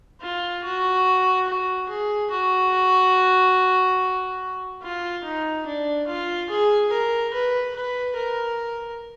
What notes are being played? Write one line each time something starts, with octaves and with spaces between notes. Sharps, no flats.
F4
F#4
F#4
G#4
F#4
F4
D#4
D4
F4
G#4
A#4
B4
B4
A#4